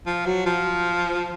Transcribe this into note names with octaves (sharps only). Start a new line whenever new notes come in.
F3
F#3
F3